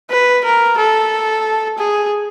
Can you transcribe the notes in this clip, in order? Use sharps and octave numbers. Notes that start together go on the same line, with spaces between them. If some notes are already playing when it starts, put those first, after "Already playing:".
B4
A#4
A4
G#4